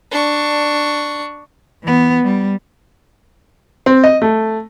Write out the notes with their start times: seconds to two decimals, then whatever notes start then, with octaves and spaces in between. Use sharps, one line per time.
0.11 D4 C#6
1.83 E3 B3
2.23 G3
3.86 C4
4.04 D#5
4.22 A3